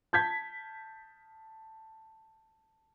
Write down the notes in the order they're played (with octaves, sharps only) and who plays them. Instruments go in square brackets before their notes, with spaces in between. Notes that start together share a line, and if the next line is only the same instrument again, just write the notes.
[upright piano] A5 G6 G#6 B6